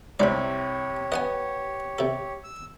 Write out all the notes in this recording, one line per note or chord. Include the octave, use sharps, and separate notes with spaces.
C2 C3 G4 C#5 D5 B5
B3 D#5 F#5 G#5
C3 A4
E6